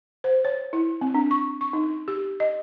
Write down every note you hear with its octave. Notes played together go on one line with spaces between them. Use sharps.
C5
C#5
E4
C4
D4
C#6
C#6
D#4
G4
D#5